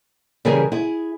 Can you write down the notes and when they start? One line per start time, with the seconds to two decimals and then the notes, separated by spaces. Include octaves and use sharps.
0.45 C#3 E3 G3 G#4 A#4
0.72 E4 G#4